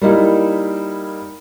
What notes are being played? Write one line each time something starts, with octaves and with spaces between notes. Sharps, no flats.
G3 A#3 D#4 E4